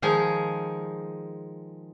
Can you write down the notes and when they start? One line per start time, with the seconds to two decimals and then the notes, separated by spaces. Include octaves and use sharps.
0.02 D#3 F3 G#3 G#4 G#5